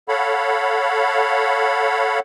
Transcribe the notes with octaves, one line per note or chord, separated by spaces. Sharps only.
A4 C#5 F5 F#5 B5